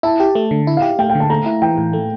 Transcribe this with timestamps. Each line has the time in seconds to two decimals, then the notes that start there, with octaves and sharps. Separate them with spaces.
0.03 E4 A5
0.20 G4
0.35 A3
0.51 D3
0.67 E4
0.77 F5
0.82 G4
0.99 A3 G5
1.10 G5
1.15 D3
1.20 A5
1.30 A3 A#5
1.46 E4
1.62 E3 G5
1.78 A2
1.93 A3